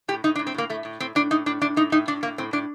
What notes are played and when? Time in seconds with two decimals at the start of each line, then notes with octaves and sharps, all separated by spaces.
0.08 A2 G4
0.24 A2 D#4
0.36 D4
0.39 A2
0.47 C4
0.54 A2 A#3
0.70 A2 A3
0.85 A2
1.00 A2 C4
1.15 A2 D4
1.31 A2 D#4
1.46 A2 D4
1.61 A2 D4
1.76 A2 D#4
1.92 A2 D#4
2.07 A2 D4
2.23 A2 A#3
2.38 A2 C4
2.53 A2 D4